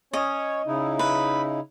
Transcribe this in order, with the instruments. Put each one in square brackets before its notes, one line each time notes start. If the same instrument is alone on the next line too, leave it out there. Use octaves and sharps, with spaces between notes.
[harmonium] C#4 C#5 [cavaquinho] D#5
[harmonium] C#3 D#4 E4
[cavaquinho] B4